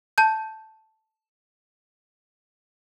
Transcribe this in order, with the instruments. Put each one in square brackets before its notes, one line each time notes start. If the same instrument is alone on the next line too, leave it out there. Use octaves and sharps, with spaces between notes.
[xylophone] A5 G6